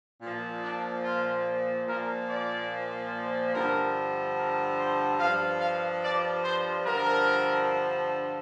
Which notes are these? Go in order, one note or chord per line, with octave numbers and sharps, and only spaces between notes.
A#2 F3
D4
F4
A#2 F3 A#4
D5
G2 D3 F3 A#4
A#4
C5
G2 F3 F5
F5
D5
C5
G2 D3 F3 A#4